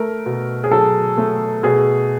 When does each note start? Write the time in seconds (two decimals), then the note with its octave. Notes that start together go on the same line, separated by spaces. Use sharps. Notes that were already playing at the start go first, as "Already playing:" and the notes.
Already playing: A3 A#4
0.26 B2
0.64 G#4
0.71 F#3 A4
1.18 A3
1.63 B2 G#4